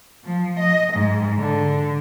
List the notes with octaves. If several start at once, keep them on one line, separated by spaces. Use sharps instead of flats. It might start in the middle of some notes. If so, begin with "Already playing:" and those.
F3
D#5
G#2
D3